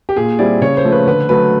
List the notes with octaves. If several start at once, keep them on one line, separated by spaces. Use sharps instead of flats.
G4
A#2 G#4
G3 C4 E4 D5
C#3 C#5
C5
F3 A3
B4
D3 B4
F#3 A3 B4